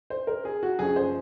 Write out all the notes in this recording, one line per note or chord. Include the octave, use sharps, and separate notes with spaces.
C5
A#4
G#4
F#4
F#1 F#2 F3 G#4
C5